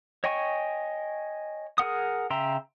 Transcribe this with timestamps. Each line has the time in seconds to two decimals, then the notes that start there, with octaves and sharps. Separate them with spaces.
0.24 C#5 D#5 G5 G#5 C#6
1.78 G#4 A#4 F#5 D#6
2.30 C#3 E5 G5 A#5 C6